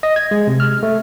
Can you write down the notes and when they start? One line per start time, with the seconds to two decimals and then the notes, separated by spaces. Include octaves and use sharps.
0.03 D#5
0.16 G#6
0.31 G#3
0.47 C3
0.60 F6
0.83 A3